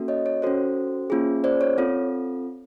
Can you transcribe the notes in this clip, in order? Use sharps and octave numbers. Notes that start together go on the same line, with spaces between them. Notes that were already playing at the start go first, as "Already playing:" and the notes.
Already playing: A#3 C#4 F#4 A4
C#5 D#5
C#5
C#4 F#4 A4 C5
A#3 C#4 F4 G#4
C5 D5
C#5
C4 F4 A4